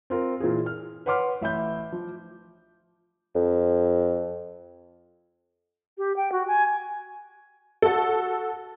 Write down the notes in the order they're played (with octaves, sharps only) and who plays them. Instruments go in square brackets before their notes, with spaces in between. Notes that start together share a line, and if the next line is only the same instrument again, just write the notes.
[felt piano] C4 F4 A#4
A#2 E3 F4 G#4
F6
B4 C#5 F#5 C6 D6 F6
A1 E5 B5 G6
F3
[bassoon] F2
[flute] G4
G5
F#4
G#5
[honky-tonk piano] F#4 A4